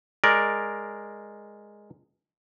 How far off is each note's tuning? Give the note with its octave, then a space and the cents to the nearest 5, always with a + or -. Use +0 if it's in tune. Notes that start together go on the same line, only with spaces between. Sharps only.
G#3 +0 A#4 +0 D5 +0